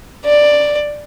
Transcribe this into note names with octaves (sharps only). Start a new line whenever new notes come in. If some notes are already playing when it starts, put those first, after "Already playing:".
D5